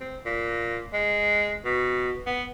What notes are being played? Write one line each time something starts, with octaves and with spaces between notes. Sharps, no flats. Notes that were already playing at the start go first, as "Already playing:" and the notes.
C4
A#2
G#3
B2
B3